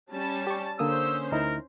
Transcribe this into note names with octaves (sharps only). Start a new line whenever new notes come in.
G3 C#4 A5
G4 C#6
D3 A#3 C#4 C5 D#6 E6
D2 D#4 E4 A#4